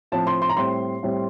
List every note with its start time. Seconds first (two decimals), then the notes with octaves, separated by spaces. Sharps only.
0.12 A2 F3 C4 A5
0.27 C6
0.42 C6
0.49 A#5
0.57 A2 G3 C4 C6
1.03 A2 G3 C4